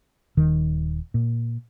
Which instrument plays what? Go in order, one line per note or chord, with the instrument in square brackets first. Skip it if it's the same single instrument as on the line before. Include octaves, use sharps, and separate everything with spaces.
[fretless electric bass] D#1 D#3
A#2